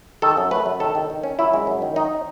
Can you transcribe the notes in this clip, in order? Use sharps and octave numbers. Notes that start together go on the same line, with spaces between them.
D#3 A4
F#2
A3 B4
F#2
D#3 A4
D#3
D#3
C#4
F#2 E4
G#3
F#2
D#3
D#4